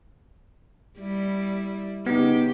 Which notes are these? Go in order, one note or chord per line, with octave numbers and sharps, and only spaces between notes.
G3 E4
C#3 B3 D#4 G4